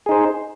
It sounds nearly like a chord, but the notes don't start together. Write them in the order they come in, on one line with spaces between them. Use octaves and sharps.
G#4 D#4 C5